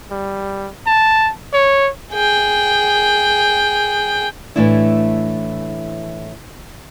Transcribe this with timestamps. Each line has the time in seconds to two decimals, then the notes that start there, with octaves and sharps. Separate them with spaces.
0.11 G3
0.87 A5
1.54 C#5
2.12 G#4 G5
4.56 A2 E3 F#3 A3 D4 E4